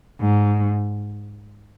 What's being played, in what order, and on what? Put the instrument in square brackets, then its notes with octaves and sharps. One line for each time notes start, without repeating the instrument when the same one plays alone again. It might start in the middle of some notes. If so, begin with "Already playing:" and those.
[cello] G#2